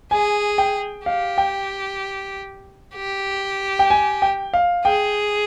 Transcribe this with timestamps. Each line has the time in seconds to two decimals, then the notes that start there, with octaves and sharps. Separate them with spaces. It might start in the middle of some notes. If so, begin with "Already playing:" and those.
0.11 G#4 G#5
0.58 G5
1.06 G4 F5
1.38 G5
2.95 G4
3.79 G5
3.90 G#5
4.22 G5
4.54 F5
4.85 G#4 G5